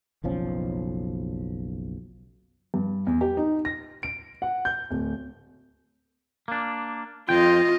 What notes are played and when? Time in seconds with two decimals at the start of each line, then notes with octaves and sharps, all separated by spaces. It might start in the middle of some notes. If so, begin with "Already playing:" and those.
0.24 F#1 B1 F3 C#4
2.74 G2
3.07 E2
3.21 G4
3.37 D#4
3.65 A#6
4.03 D7
4.42 F#5
4.65 G6
4.90 D1
6.48 A#3 D4
7.29 F2 F4 D#5 G5